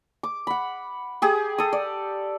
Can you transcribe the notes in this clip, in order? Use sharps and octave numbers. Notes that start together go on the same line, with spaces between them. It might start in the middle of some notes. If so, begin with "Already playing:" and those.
D6
F#5 B5
G4 G#4 D#6
A4 D#6
D5